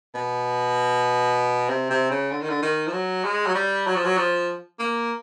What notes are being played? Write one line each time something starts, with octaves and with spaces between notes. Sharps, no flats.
B2
C3
C3
C#3
D3
D#3
D3
D#3
F3
F#3
G#3
F#3
G3
F#3
F3
F#3
F3
A#3